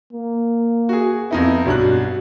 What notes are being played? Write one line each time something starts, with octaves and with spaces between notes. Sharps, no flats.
A#3
F#4 G#4
F2 B3 D#4 E4
B1 G2 F#4 F#6